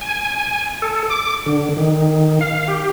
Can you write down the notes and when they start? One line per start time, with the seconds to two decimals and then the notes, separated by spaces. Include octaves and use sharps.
0.01 G#5
0.82 A4
1.10 D6
1.46 D3
1.77 D#3
2.41 F5
2.68 G4